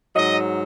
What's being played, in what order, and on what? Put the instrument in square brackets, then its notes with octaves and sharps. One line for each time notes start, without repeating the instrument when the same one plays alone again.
[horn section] G#2 F#3 D#5